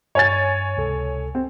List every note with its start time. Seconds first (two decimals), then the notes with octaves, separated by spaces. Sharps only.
0.15 G2 C#5 G#5 A6
0.77 C#2 C3 A4
1.35 C4